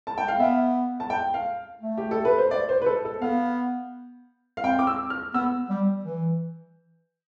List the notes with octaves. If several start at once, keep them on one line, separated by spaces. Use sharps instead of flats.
A5
G5
F5
B3 E5
A5
G5
F5
A3
G4
A4
B4
C5
D5
C5
B4
A4
A4
B3 F5
F5
C4 G5
D6
E6
F6
B3 E6
G3
E3